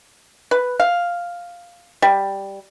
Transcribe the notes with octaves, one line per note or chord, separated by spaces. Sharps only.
B4
F5
G3